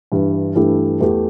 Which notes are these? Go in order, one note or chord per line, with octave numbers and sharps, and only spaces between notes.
G2 E3 G3
G2 E3 A3 E4 G4
E2 E3 A3 G4